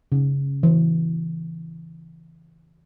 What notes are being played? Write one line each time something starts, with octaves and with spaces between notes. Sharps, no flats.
C#3
E3